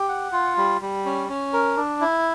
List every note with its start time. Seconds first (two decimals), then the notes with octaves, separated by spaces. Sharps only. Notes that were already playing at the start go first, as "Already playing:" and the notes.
Already playing: G4
0.09 F#5
0.32 F4
0.57 G3
0.81 G3
1.05 C#4
1.29 C#4
1.53 A#4
1.77 D4
2.01 E4